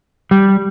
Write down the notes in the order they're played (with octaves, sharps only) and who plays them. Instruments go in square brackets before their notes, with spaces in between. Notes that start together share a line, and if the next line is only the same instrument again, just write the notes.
[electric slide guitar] G3